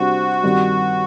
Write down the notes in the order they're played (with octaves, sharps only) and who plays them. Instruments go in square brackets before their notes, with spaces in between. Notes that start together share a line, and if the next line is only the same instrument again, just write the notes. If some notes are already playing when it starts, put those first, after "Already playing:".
Already playing: [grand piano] C3 G3 D4 C5 [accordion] F#4
[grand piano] G2 D#3 G3 C4